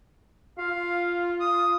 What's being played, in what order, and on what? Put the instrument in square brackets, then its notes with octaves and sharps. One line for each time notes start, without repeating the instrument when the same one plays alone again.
[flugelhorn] F4 [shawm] F5
[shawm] D#6